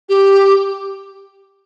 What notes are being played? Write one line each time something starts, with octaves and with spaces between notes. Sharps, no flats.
G4